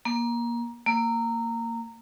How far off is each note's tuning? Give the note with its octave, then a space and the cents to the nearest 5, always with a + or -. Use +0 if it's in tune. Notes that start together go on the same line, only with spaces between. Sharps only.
A#3 +20
A#3 -20